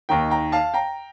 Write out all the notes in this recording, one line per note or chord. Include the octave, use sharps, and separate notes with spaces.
D#2 D#3 G5 A#5
G5 A#5
F5 A5
G5 A#5